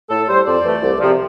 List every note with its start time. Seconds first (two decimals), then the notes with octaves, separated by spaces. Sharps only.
0.10 A2 A4
0.28 G3 C5
0.46 F2 D5
0.64 E3 A3
0.82 C2
1.01 C3 F3